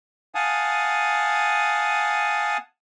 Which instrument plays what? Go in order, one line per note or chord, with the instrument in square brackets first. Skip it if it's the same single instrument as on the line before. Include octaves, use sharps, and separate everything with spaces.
[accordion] F5 F#5 G#5 A5 D#6